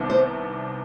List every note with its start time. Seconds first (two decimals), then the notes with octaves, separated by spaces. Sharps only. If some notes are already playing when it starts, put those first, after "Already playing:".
Already playing: C2 C3 D#3 B3 D4
0.10 C5